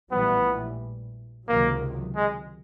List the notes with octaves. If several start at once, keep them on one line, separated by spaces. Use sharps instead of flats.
A#1 A2 E3 G3 B3
C#2 C3 D#3 F#3 A#3
G#3